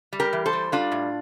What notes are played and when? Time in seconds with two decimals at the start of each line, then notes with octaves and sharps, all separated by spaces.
0.13 G3
0.20 G4 A#4
0.33 E3
0.46 A4 C5
0.53 G3
0.72 G3 D4 F4
0.92 A2